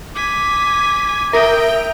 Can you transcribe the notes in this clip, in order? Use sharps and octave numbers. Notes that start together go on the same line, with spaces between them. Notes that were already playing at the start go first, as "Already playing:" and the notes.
G#5 D6 B6
A#4 E5 G5 D#6